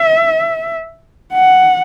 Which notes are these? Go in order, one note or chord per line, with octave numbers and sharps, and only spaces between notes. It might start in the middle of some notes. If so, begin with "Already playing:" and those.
Already playing: E5
F#5